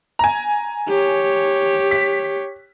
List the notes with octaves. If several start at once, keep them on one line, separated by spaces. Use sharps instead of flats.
G#5 A#5
G4 C#5
B6